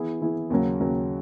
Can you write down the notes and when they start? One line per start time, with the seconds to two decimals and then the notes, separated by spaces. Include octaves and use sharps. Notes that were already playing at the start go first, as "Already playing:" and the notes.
Already playing: E3 B3 E4 G#4
0.21 E3 B3 E4 G#4
0.50 D#2 C#3 F#3
0.80 D#2 C#3 F#3